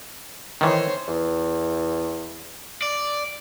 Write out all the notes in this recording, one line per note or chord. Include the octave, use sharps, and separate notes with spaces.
D#3 E3 C5 C#5
E2
D5